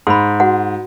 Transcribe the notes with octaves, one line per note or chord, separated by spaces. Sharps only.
G#2 B5 C6
F#4 F#5